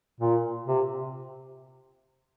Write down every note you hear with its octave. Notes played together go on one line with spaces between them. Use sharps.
A#2
C3